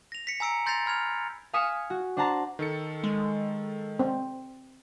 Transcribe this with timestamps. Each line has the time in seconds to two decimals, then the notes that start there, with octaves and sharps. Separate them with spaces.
0.12 A#6 F7
0.27 B6 C#7
0.40 G#5 A#5 E6 C#7 D7
0.66 C6 G6 A6 A#6 C7 F7
0.86 B5 F6 G#6 F7
1.53 F5 G#5 D#6 B6 C#7 E7
1.90 F#4
2.17 D4 C5 F#5 A5 A#5
2.59 D#3 A4 C#7
3.03 G#3
3.99 C4